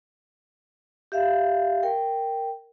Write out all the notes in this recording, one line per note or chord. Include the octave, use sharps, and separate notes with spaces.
G4 E5 F5
A#4 G5